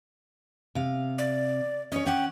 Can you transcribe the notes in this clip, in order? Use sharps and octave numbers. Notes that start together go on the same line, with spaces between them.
C3 F5
D5
C#4 C#5 D#5
C#4 F#5 G5